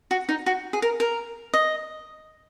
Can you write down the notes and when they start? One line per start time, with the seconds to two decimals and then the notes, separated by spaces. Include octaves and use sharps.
0.11 F#4
0.29 D#4
0.46 F#4
0.73 G#4
0.82 A#4
1.00 A#4
1.54 D#5